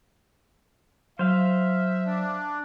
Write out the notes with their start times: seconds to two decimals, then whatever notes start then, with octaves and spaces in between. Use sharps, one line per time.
1.19 F#3 C5 E5 F5
2.06 D4